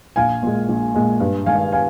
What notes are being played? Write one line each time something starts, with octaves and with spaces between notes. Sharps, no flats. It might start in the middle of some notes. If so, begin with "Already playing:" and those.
A#1 F5 G#5
A#2 G#3
A#1
A#2 G#3
G2
D#3 G#3 F5 G#5
F5 G#5